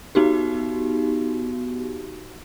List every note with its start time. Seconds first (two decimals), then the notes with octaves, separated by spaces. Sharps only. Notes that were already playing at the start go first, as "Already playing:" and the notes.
0.15 B3 D#4 F#4 G4